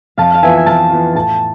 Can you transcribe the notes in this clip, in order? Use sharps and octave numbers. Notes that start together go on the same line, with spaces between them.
F2 F5 A5
F5
E3 B3 F4 E5 G#5
G#5
F2 F5 A5
E3 B3 F4
A2 A5